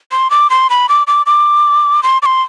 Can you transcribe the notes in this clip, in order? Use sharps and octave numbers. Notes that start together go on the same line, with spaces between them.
C6
D6
C6
B5
D6
D6
D6
C6
D6
C6